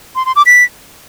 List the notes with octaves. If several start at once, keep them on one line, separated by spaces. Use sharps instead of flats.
C6
C6
D6
B6